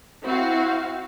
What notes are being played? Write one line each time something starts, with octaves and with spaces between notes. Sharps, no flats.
C4 E4 F#4 F5